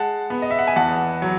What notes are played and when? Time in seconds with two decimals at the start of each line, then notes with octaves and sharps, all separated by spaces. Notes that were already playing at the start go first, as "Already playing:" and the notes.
Already playing: G#3 F#5 A5
0.30 B3
0.42 D#5
0.51 E5
0.59 F#5
0.67 G#5
0.76 E2 F#5 A5
1.22 F#3